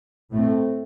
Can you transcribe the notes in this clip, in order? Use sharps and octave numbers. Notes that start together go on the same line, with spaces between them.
A2 A3 C4